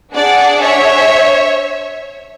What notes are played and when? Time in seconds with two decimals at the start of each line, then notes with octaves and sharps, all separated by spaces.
0.14 D4 G#4 D5 F#5
0.62 C#5 E5